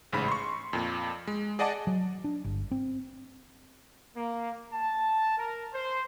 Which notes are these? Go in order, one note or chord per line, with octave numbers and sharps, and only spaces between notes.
A1 G#2 C#3 B5
C6 C#6
F2 A#2
G#3
G#4 D5 D#5 F#5 A5 D6
F#3
D4
G1
C4
A#3
A5
A#4
C5